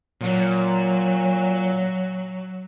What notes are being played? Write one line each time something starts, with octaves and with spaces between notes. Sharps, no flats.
A#2 F#3